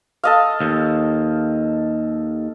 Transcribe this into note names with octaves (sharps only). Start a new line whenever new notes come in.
A4 D#5 F5
D#2